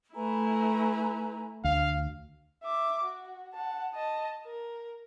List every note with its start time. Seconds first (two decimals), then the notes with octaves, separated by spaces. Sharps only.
0.15 A3 E4 B4 G#5 A#5
1.64 D2 F5
2.63 E5 D6
3.04 F#4
3.53 F#5 A5
3.95 D#5 A5
4.45 A#4